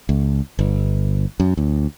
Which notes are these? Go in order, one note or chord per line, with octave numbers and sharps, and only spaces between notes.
C#2
G1
F#2
D2